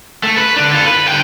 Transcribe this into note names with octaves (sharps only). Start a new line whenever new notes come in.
A3 A4
B4
D3 D4
F4 A4
B4
D3 G5